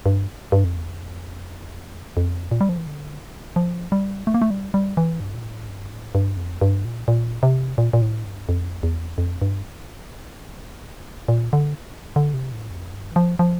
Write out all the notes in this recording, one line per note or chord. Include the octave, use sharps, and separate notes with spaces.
G2
G2
F2
E2
F2
F2
A#2
G3
F3
E3
D3
F3
G3
A3
A#3
A3
G3
G3
E3
G2
A#2
A2
G2
A2
G2
F2
G2
A#2
A#2
C3
A#2
A#2
A2
G2
F2
E2
F2
G2
A#2
D3
D3
C3
A2
F2
G2
E3
F3
F3